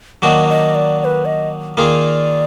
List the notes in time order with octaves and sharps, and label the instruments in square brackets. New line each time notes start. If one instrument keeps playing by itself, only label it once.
[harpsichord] D#3 F#3 A#3 D4 F#4 [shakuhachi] D#5
[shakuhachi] D#5
D5
D5
B4
D#5
[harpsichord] D#3 A#3 F4 G#4 [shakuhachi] D5